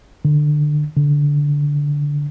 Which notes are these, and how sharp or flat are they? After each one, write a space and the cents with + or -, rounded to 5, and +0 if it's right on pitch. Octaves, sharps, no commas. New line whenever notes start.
D3 +20
D3 -15